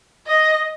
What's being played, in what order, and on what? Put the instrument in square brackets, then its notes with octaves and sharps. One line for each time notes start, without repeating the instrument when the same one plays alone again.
[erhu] D#5